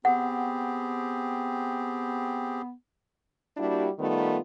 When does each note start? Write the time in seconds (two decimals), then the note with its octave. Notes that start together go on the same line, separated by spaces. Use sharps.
0.05 B3 C4 G4 G#4 F#5
3.57 G3 A#3 D4 E4 F#4 G4
3.99 D#3 G3 A3 B3 D#4 F4